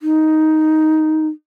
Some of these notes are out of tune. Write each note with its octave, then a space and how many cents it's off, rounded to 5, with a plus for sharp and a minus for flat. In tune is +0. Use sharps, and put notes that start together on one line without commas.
D#4 +5